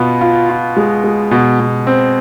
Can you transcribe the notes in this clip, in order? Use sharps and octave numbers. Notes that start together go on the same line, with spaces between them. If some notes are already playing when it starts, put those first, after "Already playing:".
Already playing: B2 B3 F4
F4
F4
G#3
G#3
B2
B2
C4